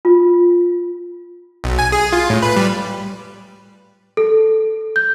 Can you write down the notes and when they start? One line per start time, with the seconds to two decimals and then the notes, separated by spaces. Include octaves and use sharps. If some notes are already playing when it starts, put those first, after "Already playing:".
0.05 F4
1.64 B1
1.79 G#5
1.92 G#4
2.13 F4
2.30 A2
2.42 B4
2.56 G3
4.17 A4
4.96 G6